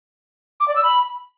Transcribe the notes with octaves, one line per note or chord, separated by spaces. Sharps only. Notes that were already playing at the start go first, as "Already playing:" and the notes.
D6
D5
E6
B5